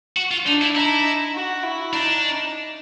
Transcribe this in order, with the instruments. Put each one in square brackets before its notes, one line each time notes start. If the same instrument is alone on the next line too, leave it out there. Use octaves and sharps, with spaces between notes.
[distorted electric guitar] F#4
F4
[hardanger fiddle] D4 [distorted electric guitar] D#4
[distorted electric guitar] E4
[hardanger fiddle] D#4 [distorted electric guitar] E4
[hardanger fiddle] F#4
E4
[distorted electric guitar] D4 [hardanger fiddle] D#4